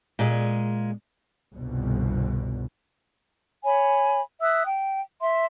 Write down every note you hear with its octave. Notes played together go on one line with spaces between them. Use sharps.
A#2 G#3
G1 C2 B2
C#5 G#5 B5
E5 D#6 E6 F#6
G5
E5 C6